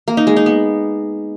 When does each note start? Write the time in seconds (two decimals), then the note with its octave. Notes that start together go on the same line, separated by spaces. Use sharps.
0.08 A#3
0.17 D#4
0.27 G#3
0.36 D#4
0.46 B3